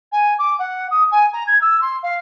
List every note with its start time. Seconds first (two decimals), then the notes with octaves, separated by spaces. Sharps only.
0.12 G#5
0.38 D6
0.59 F#5
0.91 D#6
1.11 G#5
1.33 A#5
1.47 G#6
1.62 E6
1.81 C6
2.03 F5